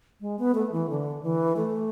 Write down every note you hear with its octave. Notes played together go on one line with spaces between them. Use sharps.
G#3
B3
A3
E3
D3
E3
A3